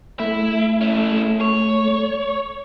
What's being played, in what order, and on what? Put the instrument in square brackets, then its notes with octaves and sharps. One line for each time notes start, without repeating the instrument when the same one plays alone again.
[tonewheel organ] A3 [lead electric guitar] E4
[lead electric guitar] C#4 E4
C#5